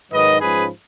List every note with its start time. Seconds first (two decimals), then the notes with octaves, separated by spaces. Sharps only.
0.11 G#2 D#3 F#3 B4 D#5
0.39 G#2 F3 G#3 C#4 G#4 B4